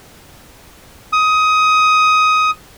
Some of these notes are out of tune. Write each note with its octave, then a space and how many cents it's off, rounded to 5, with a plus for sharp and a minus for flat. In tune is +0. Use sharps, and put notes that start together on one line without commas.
D#6 +15